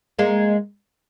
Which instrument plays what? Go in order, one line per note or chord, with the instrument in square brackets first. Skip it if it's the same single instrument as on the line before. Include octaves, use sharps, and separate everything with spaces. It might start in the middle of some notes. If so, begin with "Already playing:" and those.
[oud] G#3 A#3